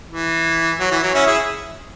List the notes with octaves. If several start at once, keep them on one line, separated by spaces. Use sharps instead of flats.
E3
F#3
E3
F#3
C#4 E4
E4 G#4